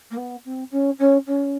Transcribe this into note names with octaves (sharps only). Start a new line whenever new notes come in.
A#3
B3
C4
C#4
C#4
C#4